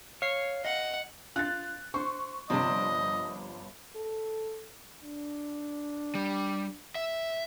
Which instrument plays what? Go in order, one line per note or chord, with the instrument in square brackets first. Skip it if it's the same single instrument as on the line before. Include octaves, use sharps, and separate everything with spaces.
[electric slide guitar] C#5 [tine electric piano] F5 C7
[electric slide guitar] D#5 [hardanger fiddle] F#5
[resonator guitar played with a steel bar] F4 [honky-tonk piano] F#6 A6
[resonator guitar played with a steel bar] C5 [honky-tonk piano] C#6
[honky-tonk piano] G1 [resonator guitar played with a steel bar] C3 F3 D4 [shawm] D#5
[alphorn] A4
[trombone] D4
[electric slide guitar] G3
E5